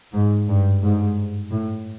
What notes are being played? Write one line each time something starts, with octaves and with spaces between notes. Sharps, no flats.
G#2
G2
G#2
A2